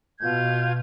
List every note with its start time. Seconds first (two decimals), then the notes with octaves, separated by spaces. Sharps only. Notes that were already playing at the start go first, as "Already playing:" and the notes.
0.21 B2 F4 G6 G#6